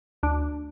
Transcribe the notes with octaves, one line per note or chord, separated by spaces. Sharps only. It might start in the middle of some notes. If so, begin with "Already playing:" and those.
D2 D4